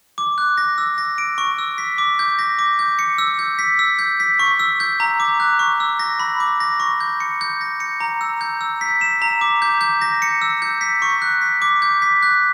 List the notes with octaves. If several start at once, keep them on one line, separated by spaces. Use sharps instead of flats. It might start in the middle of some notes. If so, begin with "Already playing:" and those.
D6
F#6
A#6
E6
A#6
D7
C#6
E6
B6
D6
G6
A#6
D6
G6
C#7
E6
G6
B6
E6
G6
B6
C#6
E6
G6
A#5
D6
F#6
C#6
E6
A#6
B5
D6
A#6
C#6
G6
C#7
G6
A#6
C#7
A#5
E6
G6
E6
B6
E7
A#5
D6
G6
G6
A#6
C#7
E6
G6
B6
C#6
F#6
B6
D6
G6
B6
F#6